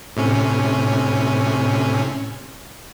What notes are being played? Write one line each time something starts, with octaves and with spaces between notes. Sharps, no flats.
A2 C3 C#4